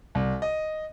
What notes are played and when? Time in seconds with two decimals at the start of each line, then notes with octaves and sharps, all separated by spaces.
0.15 C2
0.42 D#5